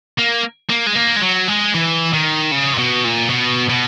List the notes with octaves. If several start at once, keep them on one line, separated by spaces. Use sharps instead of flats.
A#3
A#3
G#3
A#3
G#3
F#3
G#3
E3
D#3
C#3
A#2
B2
A#2
B2
B2